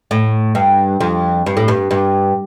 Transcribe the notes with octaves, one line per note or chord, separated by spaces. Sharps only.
A2
G2
F2
G2
A2
G2
G2